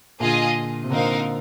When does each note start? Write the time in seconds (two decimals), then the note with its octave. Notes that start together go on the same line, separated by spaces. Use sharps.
0.20 A#2 D3 F4 G#4 D#5 G#5
0.83 C3
0.90 A#2 D3 C4 D#4 A#4 F5